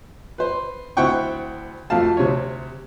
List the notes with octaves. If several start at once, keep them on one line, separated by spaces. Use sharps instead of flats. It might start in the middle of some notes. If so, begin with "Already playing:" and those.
B4 C5
D2 C4 E4 F#5 G5 C#6
F2 F3 A3 F#4 F5 A5
D2 C3 C#5